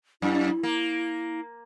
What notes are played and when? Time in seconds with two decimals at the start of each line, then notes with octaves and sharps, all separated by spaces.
0.22 F#2 E4
0.63 A#3